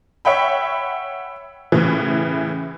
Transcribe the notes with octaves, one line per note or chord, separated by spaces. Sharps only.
C#5 E5 F#5 G5 B5
A2 C#3 E3